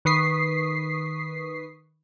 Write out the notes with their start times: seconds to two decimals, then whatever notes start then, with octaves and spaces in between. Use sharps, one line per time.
0.05 D#3 B4 C#6 D#6 B6 C7